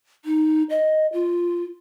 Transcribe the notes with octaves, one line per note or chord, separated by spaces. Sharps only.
D#4
D#5
F4